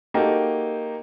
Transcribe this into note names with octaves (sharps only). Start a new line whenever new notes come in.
A#3 D#4 F#4 G4 A4